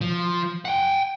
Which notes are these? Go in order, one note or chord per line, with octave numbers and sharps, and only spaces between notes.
F3
F#5 G5